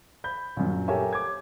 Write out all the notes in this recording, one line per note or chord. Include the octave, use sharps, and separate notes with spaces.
B5 G6
A#1 F#2
G4 A4 A#4 C#5 E5 G#5
D6 G#6